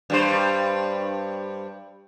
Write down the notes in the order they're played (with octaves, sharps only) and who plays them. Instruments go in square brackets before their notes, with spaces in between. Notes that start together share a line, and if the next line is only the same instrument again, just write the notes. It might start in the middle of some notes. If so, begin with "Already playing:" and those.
[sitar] G2 G3 C5